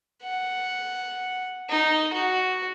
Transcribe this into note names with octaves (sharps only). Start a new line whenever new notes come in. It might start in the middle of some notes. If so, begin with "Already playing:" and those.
F#5
D#4
F#4